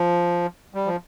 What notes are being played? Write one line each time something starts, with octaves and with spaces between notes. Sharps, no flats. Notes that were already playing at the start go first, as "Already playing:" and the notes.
Already playing: F3
G3
F3